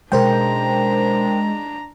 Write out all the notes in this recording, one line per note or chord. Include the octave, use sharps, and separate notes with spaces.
B2 G#3 C#4 D4 A#4 C5 G5 A#5